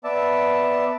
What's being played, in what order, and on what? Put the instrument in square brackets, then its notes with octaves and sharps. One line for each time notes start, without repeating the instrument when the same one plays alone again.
[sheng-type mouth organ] B3 D5 E5 A5